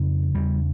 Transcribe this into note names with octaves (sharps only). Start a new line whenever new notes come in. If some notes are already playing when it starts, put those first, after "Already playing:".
Already playing: F2 C#3 C4
E2 C#3 G3